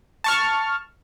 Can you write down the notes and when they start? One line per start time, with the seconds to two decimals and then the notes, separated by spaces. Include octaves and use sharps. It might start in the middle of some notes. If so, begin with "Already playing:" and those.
0.24 A5 C#6 F6